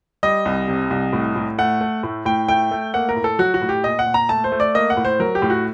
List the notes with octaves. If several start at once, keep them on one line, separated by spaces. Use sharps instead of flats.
G3 D#5
C2
C3
C2
A2
A2
A3 F#5
A3
A2
A2 G5
A3 G5
A3
A#3 F#5
A#4
A2
A4
F#3 F#4
F#4
A2
G4
A#2 D#5
F#5
A#2
A#5
A3 A5
C5
A3
D5
A#3 D#5
F#5
A2
C5
F#3 A#4
G4
A2
F#4